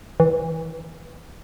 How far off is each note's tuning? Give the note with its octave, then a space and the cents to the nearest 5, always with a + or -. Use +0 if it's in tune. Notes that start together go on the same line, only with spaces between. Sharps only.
E3 -15